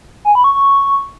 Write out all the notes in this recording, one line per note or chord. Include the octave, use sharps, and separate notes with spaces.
G#5
B5
C#6
C#6